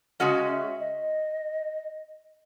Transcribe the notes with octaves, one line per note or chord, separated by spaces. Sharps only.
C#3 G#3 C#4 F#4 D#5
E5
D#5